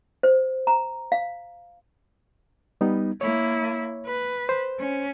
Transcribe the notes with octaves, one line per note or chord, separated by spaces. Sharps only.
C5
A#5
F5
G3 B3 D#4
A#3 E4 C#5
B4
C5
C#4